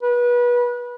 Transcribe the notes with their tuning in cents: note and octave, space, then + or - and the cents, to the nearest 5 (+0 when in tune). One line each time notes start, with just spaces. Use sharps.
B4 -30